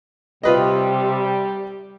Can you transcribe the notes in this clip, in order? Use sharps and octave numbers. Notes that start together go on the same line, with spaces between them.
C3 G3 F4 G4 B4 D#5